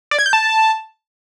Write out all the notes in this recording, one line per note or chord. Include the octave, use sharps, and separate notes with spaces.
D5
G#6
G6
A5